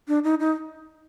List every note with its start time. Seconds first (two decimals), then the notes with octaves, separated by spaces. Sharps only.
0.08 D4
0.24 D#4
0.40 D#4